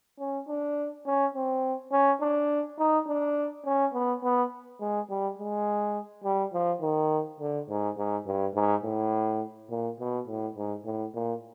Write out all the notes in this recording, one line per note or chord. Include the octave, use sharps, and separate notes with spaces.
C#4
D4
C#4
C4
C#4
D4
D#4
D4
C#4
B3
B3
G#3
G3
G#3
G3
F3
D#3
D3
G#2
G#2
G2
G#2
A2
A#2
B2
A2
G#2
A2
A#2